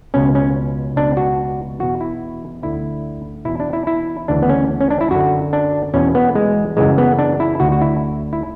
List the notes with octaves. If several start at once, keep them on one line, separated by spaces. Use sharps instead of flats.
C#2 B2 C#4
C#4
C#2 B2 D4
F#4
E2 B2 F#4
E4
D2 D3 E4
E2 B2 E4
D4
E4
E4
D2 C#3 E3 D4
B3
C#4
C#4
D4
E4
F#2 D3 F#4
D4
E2 B2 C#4
B3
G#3
F#2 C#3 E3 G#3
B3
D4
E4
D2 D3 F#4
F#4
E4
E4